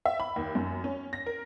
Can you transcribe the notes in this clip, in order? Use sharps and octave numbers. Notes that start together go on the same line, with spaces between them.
E5
B5
D#2
F#2
C#4
A#6
A#4